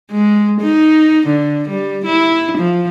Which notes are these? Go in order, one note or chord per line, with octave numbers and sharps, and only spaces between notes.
G#3
D#4
D3
G3
E4
F3